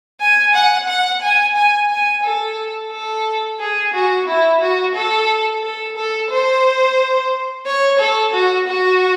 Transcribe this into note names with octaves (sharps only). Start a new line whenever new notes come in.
G#5
F#5
F#5
G#5
G#5
G#5
A4
A4
G#4
F#4
E4
F#4
A4
A4
A4
C5
C#5
A4
F#4
F#4